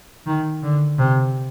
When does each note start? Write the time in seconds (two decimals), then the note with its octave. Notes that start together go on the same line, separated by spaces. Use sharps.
0.27 D#3
0.63 D3
0.98 C3